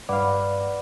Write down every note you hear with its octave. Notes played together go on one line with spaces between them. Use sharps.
G2 B4 D5 F5 F#5 D6